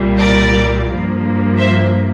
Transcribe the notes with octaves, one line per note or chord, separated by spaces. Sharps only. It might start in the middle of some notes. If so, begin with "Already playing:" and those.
Already playing: C2 A#2 G3
A#4 D5
G2 F3 A#3
C5 E5